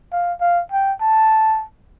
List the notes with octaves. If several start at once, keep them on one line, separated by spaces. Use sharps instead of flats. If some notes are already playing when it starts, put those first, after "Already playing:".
F5
F5
G5
A5